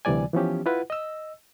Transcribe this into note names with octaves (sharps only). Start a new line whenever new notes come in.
D2 C3 E3 G3 D5 G#5
E3 F3 B3 C#4 G4
E4 F4 B4 F#5
D#5 E6